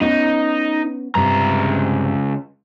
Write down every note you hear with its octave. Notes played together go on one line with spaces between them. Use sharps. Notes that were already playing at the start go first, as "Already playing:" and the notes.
B3 C#4 D#4 B4
C#2 G2 C3 A#5